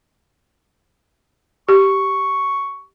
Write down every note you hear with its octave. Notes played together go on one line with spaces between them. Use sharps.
G4 C#6